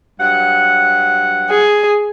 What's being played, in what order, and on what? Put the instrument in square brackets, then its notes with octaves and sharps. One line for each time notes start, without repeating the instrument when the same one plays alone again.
[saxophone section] G2 F#3 F#5
[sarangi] G#4